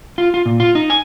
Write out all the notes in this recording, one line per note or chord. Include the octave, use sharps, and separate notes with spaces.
F4
F4
A#2
F4
D#4
G#5